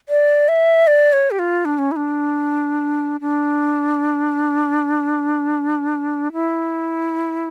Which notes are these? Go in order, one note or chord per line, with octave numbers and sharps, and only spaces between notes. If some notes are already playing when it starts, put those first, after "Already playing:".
D5
E5
D5
C#5
G4
F4
D4
C#4
E4
D4
D4
E4